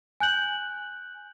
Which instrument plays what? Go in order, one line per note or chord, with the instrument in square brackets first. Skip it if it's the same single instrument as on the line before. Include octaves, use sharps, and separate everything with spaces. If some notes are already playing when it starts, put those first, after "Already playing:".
[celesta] G#5 F#6 G6 F#7